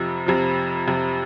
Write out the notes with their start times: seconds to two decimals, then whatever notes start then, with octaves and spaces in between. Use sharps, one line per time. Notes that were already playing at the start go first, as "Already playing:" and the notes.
Already playing: F2 C3 F3
0.26 F2 C3 F3
0.87 F2 C3 F3